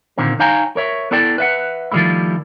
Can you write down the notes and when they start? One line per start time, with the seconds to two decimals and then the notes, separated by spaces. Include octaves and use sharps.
0.18 A#2 D3 D#3 A#3 C4
0.39 D#4 C#5 F5 G5 G#5 A#5
0.76 A#4 C#5 E5
1.11 B3 E4 A4 D5 G5
1.38 B4 E5 F#5
1.92 D#3 F3 G3 A3 E4